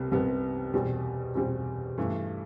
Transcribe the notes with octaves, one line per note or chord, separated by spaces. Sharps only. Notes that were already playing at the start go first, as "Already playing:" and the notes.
Already playing: C2 C3 G3 B3
C2 C3 G3 B3
E2 B2 G3 C4
E2 B2 G3 C4
G2 E3 A3